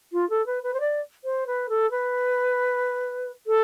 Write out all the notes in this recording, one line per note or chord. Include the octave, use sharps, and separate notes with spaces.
F4
A4
B4
B4
C5
D5
C5
B4
A4
B4
A4